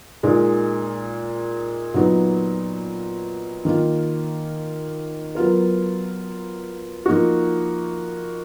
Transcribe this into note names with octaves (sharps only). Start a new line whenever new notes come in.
A#2 G#3 D#4 A#4
A#2 F#3 B3 D#4 F#4
D#3 A#3 F4
F#3 B3 F4 A#4
F3 A#3 D#4 F#4